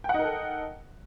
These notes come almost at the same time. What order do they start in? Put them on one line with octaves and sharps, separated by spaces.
G5 F#5 D#4 A#4 A4